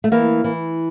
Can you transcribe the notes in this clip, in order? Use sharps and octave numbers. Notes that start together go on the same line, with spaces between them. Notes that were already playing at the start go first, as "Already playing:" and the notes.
A3
E3 A#3
E3